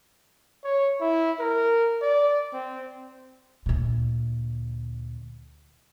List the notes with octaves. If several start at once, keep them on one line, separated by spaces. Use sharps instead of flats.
C#5
E4
A#4
D5
C4
D2 A#2